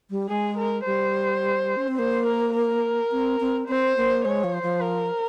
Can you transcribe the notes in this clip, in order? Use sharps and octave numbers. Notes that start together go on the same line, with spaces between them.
G3
G#3 G#4
A#4
G3 C5
C#4
C4
A#3 C5
A#4
A#4
C4
C4
C4 C5
A#3
G#3 C#5
F3
C5
F3
A#4